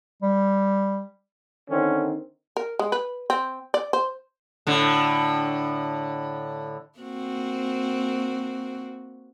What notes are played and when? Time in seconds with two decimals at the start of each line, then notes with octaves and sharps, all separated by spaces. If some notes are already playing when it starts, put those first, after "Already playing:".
0.22 G3
1.70 D3 D#3 C4 C#4
2.57 A#4
2.79 G#3
2.92 B4
3.30 C4
3.74 D5
3.93 C5
4.67 A2 D3
6.99 A#3 C4 F#4